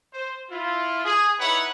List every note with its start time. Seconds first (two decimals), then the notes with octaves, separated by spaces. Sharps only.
0.13 C5
0.50 E4 F4
1.04 G#4
1.39 D#4 E4 B4 C#5 F#5